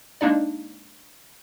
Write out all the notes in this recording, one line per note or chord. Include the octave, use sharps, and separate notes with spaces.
G#3 A#3 D4 D#4 D5